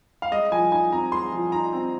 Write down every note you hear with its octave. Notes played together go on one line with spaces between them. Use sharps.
F5
G#3 D#5
F3 G#5
D#4 G#5
C4 A#5
G#3 C6
F3
D#4 A#5
C4